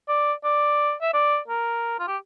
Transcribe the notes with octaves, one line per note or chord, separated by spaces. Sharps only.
D5
D5
E5
D5
A#4
F4
G4